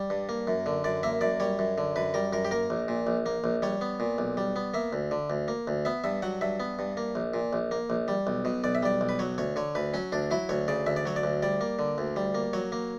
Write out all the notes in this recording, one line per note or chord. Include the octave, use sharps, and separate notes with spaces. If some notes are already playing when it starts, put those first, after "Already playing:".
Already playing: G3
G2
A#3
F#2
D3
F#2 D5
A#3 E5
F#2 D5
G3 C#5
F#2
D3
F#2 B4
G3 A#4
F#2 A#4
G4
A#3 A#4
A#1
A#2
A#1
A#3
A#1
G3 C#5
B3
A#2
B1
G3
B3
A#3 E5
D2
D3
D2
A#3
D2
B3 E5
G2 E5
F#3 F#5
G2 E5
B3
G2
A#3
A#1
A#2
A#1
A#3
A#1
G3
B1
B2
B1 D5
E5
G3 D5
B1
B4
F#3 C#5
D2 C#5
D3 C#5
D2 B4
F#3 C#4
D2 D4
F#3 E4
D2 C#5
C#3 D5
D2 E5
D5
F#3 C#5
D5
D2
G3 D5
A#3
D3
D2
G3
A#3
F#3 C#5
A#3